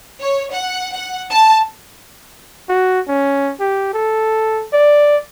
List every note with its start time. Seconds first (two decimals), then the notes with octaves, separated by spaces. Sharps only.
0.21 C#5
0.52 F#5
0.94 F#5
1.31 A5
2.69 F#4
3.08 C#4
3.60 G4
3.94 A4
4.73 D5